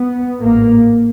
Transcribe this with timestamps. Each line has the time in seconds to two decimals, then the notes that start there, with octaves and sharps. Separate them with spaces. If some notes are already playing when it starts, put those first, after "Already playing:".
Already playing: B3
0.40 A1 G#2 A#3